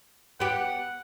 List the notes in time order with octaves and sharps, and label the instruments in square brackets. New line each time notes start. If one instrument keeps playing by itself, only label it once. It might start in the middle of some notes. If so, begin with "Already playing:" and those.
[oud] B3 G4 [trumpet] F#5